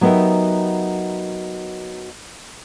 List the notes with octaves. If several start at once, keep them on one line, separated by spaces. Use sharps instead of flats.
F#3 B3 D#4 G4 A#4 E5